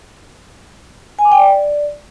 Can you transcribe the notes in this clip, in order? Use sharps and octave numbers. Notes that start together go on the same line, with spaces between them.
G#5
D6
G5
D5